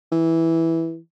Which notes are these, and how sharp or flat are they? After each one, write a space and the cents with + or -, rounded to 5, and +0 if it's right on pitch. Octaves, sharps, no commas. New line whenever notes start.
E3 -5